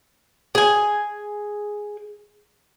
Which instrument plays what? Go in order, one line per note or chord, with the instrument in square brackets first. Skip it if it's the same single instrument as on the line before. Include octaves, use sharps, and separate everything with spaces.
[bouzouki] G#4 G#5